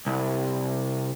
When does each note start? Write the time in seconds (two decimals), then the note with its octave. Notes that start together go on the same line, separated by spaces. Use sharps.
0.07 C2